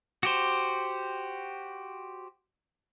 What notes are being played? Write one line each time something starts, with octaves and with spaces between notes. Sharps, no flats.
F#4 G4 C5